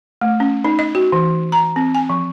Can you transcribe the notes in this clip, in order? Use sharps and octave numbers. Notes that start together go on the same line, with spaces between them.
A3
C#4
D#4
D#5
F#4
E3
A#5
C4
G#5
F3